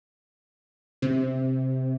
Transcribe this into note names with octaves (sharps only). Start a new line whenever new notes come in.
C3